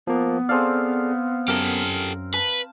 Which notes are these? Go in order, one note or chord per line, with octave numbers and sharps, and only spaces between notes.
F3 A#3 B3
C4 G#4 A4 D5 F5
F#2 G4 A4 A#4
B4 A5